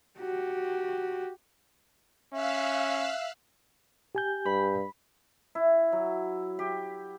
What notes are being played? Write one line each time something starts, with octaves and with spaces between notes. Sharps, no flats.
F#4 G4
C#4 E5 F5 E6 F#6
G4 G#5 G6
G2 B5
E4
F#3
G4